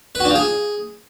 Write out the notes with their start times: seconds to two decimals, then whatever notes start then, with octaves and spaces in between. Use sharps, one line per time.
0.15 B4
0.20 F#4
0.25 D4
0.30 F3
0.35 G#4